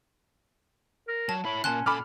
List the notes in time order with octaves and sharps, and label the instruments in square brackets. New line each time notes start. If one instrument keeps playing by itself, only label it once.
[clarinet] A#4
[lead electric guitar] F#3 [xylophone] A5
[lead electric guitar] E4 C#5 [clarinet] B5
[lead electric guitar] D2 A#2 [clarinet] C#4 [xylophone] A5 C6 F#6
[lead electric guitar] A#2 A4 [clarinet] C#4 [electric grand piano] B5 D6 F6